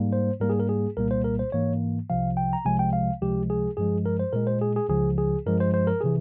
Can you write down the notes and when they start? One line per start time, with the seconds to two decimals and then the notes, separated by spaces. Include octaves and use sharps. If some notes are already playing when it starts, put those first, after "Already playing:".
Already playing: G#2 G3 A#3
0.13 C5
0.40 G#2 G3 A#3 A#4
0.50 G#4
0.60 A#4
0.69 G#4
0.97 C2 A#2 G3 A#3 A#4
1.11 C5
1.24 A#4
1.39 C5
1.52 G#2 E3 A#3 C#5
2.10 C2 C3 F3 F5
2.37 G5
2.53 A#5
2.65 C2 C3 F3 G#3 G#5
2.79 G5
2.93 F5
3.21 C#2 C3 F3 G#3 G4
3.50 G#4
3.77 G2 F3 G#3 G#4
4.06 A#4
4.19 C5
4.33 A#2 G#3 A#4
4.47 C5
4.62 G#4
4.76 G#4
4.89 C#2 C#3 F3 G#4
5.18 G#4
5.46 G2 F3 G#3 A#4
5.60 C5
5.74 C5
5.87 A#4
6.01 C3 E3 G#4